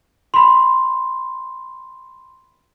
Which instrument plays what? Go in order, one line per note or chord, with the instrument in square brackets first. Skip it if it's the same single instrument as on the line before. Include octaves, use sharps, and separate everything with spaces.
[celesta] B5 C6